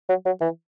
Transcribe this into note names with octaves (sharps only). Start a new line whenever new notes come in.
F#3
F#3
E3